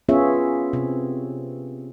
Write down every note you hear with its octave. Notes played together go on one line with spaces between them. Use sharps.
B3 C#4 F4 G#4 C#5 E5
C3 C4